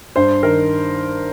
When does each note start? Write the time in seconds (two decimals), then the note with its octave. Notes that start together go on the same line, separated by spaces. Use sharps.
0.16 G2 C5
0.43 D#3 A#4